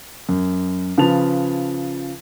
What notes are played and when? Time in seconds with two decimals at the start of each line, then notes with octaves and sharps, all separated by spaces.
0.29 F#2
0.98 C#3 F3 B4 A5 F7